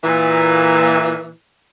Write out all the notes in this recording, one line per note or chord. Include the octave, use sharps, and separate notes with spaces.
A#2 E3